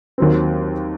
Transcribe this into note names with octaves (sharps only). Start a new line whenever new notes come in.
D#2 D#3 F#3 C4